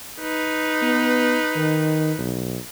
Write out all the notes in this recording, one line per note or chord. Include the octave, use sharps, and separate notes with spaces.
D#4 B4
B3
D#3
B1